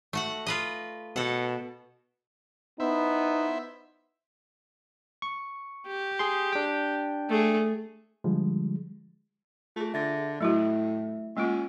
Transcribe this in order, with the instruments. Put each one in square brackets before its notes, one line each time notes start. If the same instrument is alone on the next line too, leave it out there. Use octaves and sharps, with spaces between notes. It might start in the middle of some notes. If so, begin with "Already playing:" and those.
[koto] A3 F#4 F#5
F4 B4 D#5
[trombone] B2 [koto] A4 F#5
[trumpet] B3 [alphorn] D#4 [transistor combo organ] E4 C5 E5
[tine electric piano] C#6
[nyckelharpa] G4
[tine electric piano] G#4 C6
D4 G5
[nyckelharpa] A3 G#4
[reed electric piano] D3 F3 G3 G#3
[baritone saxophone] A3 [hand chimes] F4 G#4
[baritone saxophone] D3 [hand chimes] E5 A6 A#6
[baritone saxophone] A2 [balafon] F#3 E4 F#4 [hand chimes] A3 E5
[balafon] G#3 A#3 F4 [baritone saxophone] C#4